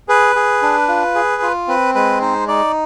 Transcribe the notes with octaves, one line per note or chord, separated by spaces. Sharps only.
G#4 B4
G#4
D4
F4
G#4
F4
C4 B4
G#3 B4
D#4 C5
D#4 D5